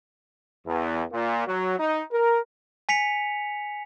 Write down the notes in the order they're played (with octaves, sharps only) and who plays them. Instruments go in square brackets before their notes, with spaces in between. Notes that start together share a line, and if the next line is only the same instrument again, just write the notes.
[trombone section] E2
A#2
F#3
D#4
A#4
[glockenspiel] G#5 B6 C#7 F7